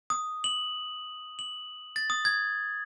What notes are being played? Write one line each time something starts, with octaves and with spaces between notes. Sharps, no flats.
D#6
F#7
F#7
A6
D#6
G#6